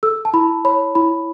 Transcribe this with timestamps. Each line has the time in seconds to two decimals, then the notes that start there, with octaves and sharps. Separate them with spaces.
0.03 A4 E6
0.25 A5
0.33 E4 B5
0.65 C#5 B5
0.95 E4 B5